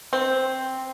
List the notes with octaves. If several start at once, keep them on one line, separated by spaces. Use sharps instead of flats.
C4